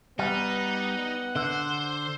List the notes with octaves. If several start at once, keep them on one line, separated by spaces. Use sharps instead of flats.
G3 B3 D#4 F#5
D3 C5